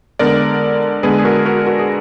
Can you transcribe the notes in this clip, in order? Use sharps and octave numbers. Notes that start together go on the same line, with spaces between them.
D3 G#3 B3 A#4 D5
D3 G#3 B3 G#4 B4
G#4
F#4 A#4
F#4 A#4
F#4 A#4
G#4